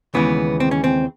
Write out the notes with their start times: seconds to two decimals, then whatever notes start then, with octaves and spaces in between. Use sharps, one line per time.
0.14 D#2 C#3 E3 G#3 B3
0.60 C4
0.71 C#4
0.84 C4